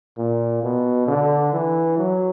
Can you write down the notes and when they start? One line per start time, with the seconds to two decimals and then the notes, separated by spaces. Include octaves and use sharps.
0.18 A#2
0.63 B2
1.08 D3
1.53 E3
1.98 F#3